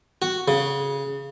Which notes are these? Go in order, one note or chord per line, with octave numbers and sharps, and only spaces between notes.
F#4
C#3